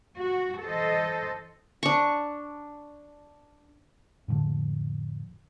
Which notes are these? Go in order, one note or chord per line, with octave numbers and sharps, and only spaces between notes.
F#4
E3 A4 C5 D#5
D4 C#6
F2 A2 D3 F3